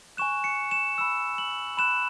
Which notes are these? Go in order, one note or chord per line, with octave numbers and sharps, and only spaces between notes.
G#5 C#6 F#6 E7
C#7
E7
B5 E6 E7
F#7
B5 F#6 E7